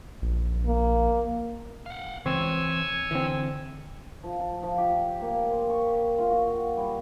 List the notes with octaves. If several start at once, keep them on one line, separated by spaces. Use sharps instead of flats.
A#1
A#3
F5 F#5
C#2 E3 C4 C#5 G#5 C6 E6
D3 E3 C4
F3
A5
F3
G4
A#3
C6
C#6
F4
F#4
G3